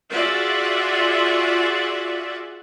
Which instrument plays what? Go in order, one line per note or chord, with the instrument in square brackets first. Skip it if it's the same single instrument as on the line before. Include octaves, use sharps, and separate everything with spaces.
[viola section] F4 F#4 G#4 D5 E5 F#5